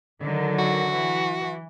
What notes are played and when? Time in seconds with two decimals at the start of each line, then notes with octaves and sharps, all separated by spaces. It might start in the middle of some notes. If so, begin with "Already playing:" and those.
0.20 D3 D#3 F#3
0.59 F#4
0.92 E3